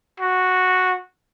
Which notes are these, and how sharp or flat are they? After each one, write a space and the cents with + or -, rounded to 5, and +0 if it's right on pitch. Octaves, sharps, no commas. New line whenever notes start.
F#4 -5